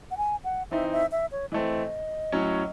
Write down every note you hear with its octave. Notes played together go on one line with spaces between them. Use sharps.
F#5
G#5
F#5
E3 C4 D#4 E5
E5
E5
C#5
E3 A3 C4 D#5
A2 F#3 C#4